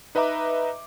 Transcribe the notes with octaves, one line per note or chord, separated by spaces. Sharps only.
D#4 B4 D#5 E5 A#5 D6